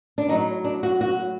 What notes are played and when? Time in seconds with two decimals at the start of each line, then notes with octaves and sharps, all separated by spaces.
0.18 D4
0.29 A2 F#3 D#4
0.64 D4
0.83 F#4
1.01 F#4